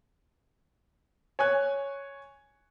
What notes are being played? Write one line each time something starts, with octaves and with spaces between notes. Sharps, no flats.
C#5 G#5 F#6